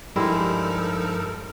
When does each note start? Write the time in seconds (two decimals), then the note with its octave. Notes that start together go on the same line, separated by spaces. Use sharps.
0.16 G2 F3 G3 G#3 D#4 E4 A4 A#4